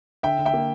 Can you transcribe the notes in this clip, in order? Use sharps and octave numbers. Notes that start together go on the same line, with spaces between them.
D3 E5 G5
D3
E5 G5
A#3